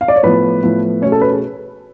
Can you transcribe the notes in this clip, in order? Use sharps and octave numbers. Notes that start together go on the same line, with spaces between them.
F5
D5
C#5
A2 F3 B3 B4
A2 F3 B3
B2 A3 C#4 C#5
A4
B4
G#4